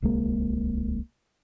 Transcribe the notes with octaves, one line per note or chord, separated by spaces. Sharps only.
D1 C2 G#3 A#3